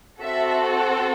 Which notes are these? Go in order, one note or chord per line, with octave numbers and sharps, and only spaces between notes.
C4 F#4 A4 E5